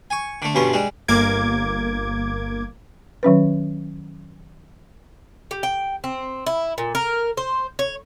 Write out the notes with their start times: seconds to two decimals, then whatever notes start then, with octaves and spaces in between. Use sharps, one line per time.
0.10 G#5 C#6
0.42 D3 A3
0.55 B1 G2 B3 C#4 C6
0.73 G3 G#3
1.08 G1 A#3 D6 G#6
3.23 D#3 F#3 C#4 B4
5.51 G4
5.63 G5
6.04 C4
6.47 E4
6.78 A#2
6.95 A#4
7.37 C5
7.79 C#5